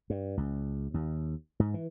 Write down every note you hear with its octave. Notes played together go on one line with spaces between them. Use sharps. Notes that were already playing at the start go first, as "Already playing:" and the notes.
G2
C#2
D#2
G#2
E3